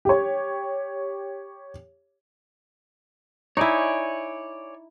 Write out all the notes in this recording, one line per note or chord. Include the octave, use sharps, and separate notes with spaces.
G4 C#5
D#4 E4 C#5 D5 G#5